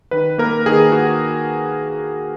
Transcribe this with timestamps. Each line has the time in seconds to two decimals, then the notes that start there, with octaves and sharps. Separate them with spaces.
0.11 D#3 B4
0.38 A#3 A#4
0.66 D#3 G#4
0.92 D#3 F#4